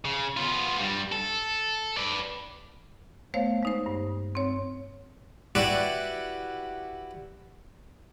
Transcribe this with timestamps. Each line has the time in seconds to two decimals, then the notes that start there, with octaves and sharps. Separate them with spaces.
0.05 C#3
0.37 B3 F4
0.80 G2 G3
1.12 A4
1.97 B4 D5
3.34 A3 B3 C5 C#5 F5
3.63 G#3 D#4 C5
3.86 G2
4.35 C4 C#5
5.55 E4 F#4 G4 B4 D5 F#5